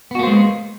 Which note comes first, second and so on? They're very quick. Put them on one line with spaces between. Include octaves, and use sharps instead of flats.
B3 F#4 A#3 C5 G#3